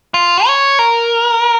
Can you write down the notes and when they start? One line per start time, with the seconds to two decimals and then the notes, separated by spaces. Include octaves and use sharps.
0.14 F4
0.46 C#5
0.79 A#4